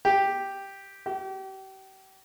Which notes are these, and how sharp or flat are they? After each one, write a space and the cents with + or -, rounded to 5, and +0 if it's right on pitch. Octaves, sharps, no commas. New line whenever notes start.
G4 +0
G4 -35